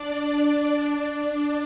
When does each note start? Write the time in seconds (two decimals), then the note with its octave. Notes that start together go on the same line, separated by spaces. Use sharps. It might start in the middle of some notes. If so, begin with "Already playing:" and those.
Already playing: D4 D5